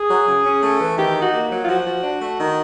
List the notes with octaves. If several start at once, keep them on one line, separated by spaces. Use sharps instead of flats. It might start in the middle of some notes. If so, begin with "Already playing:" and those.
Already playing: G#4
F#3
C#3
C#4
A3
E3
D#3 G4
D#4
F#4
A#3
F#3
F4
F3 F#4
F3
D4
A3
D#3